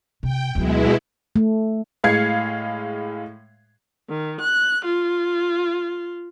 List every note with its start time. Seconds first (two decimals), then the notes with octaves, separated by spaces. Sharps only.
0.23 C3 G5
0.55 D2 B2 F#3 G#3 E4
1.36 A3
2.04 A2 G#3 F5 G#6 C7 C#7
4.08 D#3
4.41 F#6
4.85 F4